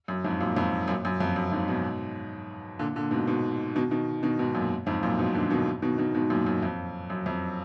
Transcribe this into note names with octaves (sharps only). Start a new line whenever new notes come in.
F#2
F2 G#2
F#2 A#2
F2 G#2
F#2 A#2
F#2
F2
F#2
F2 G#2
G#2 B2
A#2 D3
A#2 D3
G#2 B2
G#2 B2
B2 D#3
B2 D#3
B2 D#3
G#2 B2
F#2 A#2
F2 G#2
F#2 A#2
G#2 B2
A#2 D3
B2 D#3
B2 D#3
B2 D#3
G#2 B2
F#2 A#2
F#2
F2
F#2
F2